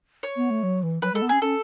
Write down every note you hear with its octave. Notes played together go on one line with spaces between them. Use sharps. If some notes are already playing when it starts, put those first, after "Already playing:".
C#5
B3
A3
F#3
E3
F#3 B4
G#3 A4
B3
C#4 G#4
C#4 A4